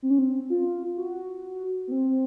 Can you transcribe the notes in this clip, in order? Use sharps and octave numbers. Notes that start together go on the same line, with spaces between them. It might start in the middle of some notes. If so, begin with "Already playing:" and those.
C4
C#4
C4
F4
F#4
B3
C4